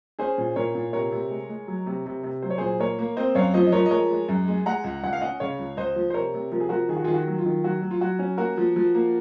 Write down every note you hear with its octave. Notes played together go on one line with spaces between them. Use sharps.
C#4 G#4 C5
A#2
A#2 A#4 C#5
A#2
C3 A#4 C#5
C3
G#3
G#3
F#3
C3
C3
C3
F#3 C5
C#5
A#2 G#4 C5
A#3 A#4 C#5
A#3
C4 C5 D#5
F#2 C#5 F5
F3 C5 D#5
D#5
F3 A#4 C#5
D#5
G#3 A#4 C#5
G#3
F#2
G#3
G#3 F#5 A#5
C#2
C#2 F#5
F5
C#4 D#5 F#5
C#3 C#5 F5
C#2
C#2 C5 D#5
F3
C5
C3 A#4 C#5
C3
F3 A#4
G#4
F3 F#4 A#4
D#3 G#4
F#4
D#3 F4 G#4
F#4
F#3
F4
D#3
F#3 F#4
F#3
F4
F#3 F#4
C#4
A#3 F#4 A#4
F3
F3
A#3